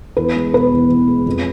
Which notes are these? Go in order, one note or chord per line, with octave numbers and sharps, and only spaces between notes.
E2 B4
G#3
B2 B4
E2
E2
G#3
F2